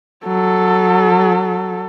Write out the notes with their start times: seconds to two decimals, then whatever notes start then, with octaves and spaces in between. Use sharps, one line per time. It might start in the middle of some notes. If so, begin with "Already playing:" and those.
0.25 F#3 A4